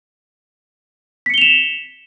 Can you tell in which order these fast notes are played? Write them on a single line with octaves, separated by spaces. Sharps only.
B6 C#7 G7 F7 E7